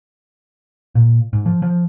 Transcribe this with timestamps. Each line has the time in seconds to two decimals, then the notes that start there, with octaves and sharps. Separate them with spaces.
0.95 A#2
1.33 G#2
1.46 F3
1.62 F3